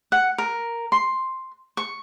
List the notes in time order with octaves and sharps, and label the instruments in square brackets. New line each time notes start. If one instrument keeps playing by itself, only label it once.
[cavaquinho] F#5
A#4
C6
C#6